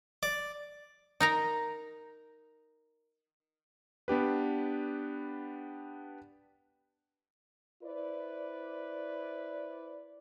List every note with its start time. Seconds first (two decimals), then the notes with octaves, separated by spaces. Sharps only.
0.23 D5
1.20 D#4 A#4 A#5
4.08 B3 D4 G4 B4
7.83 E4 B4 C5 D5